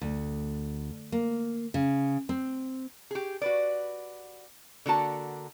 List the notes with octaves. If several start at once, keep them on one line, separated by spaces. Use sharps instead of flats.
D2
A#3
C#3
C4
G4 G#4
F#4 B4 D5
D3 A#3 F#4 A5